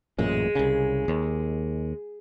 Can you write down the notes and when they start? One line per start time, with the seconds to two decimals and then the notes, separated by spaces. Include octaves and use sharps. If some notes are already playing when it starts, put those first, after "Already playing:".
0.18 A1 F#2 A#2 G#3
0.55 C2 C#3
1.08 D#2